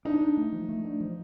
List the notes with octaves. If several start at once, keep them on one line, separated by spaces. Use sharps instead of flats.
D4 D#4
D4
A3
F3
A3
D4
F3